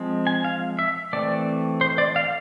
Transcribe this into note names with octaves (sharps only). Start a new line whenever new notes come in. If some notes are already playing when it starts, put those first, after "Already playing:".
Already playing: F3 G#3 C4
G#5
F5
E5
E3 A3 C4 D5
C5
D5
F5